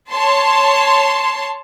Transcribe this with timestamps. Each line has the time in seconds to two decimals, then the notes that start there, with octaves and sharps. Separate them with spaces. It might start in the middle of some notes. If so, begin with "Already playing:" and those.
0.14 C#5 A5 C6